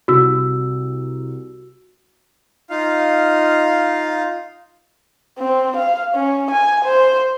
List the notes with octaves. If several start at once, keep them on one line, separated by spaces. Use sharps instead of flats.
C2 F#4 E6
D#4 F4 F5
C4
F5
C#4
G#5
C5